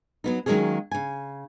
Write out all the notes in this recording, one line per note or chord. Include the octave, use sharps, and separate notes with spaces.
F#3 B3 D#4
D#3 F#3 G#3 A#3 C#4 G#4
C#3 G#5